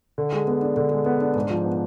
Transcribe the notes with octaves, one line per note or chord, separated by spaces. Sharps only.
D3
G#3
B3
D4
D3
G#3
B3
D4
G#2
F3
B3